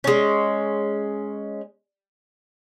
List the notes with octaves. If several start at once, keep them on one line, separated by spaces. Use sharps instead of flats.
G#3 C#4